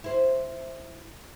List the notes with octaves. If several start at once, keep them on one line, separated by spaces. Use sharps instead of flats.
E4 C5